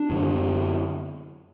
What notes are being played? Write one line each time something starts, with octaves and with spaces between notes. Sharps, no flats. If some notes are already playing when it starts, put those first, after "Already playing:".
Already playing: D4
F#2 D3